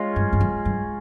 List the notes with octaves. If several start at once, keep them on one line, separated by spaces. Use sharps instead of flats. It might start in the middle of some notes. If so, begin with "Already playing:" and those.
Already playing: G#3 C#4 F4
G2
G2
F2
G2